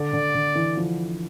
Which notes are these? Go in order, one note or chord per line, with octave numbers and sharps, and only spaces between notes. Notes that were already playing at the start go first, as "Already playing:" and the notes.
Already playing: D3 D5
D3
D3
E3
F3